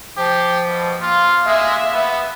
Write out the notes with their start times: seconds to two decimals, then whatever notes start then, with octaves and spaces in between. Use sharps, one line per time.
0.17 F3 G4
0.68 B2
1.02 A#3 F4
1.47 G#3 E5
1.93 B3